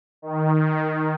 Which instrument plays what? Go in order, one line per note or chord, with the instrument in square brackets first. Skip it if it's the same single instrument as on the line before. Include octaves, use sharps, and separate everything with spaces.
[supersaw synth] D#3